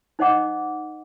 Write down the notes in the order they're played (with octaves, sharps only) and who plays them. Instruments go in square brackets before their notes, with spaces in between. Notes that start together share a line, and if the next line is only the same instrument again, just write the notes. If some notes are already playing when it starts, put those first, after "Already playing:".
[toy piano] D#4 C5 D#5 F#5 D6